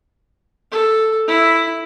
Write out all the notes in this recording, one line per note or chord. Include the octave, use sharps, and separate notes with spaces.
A4
E4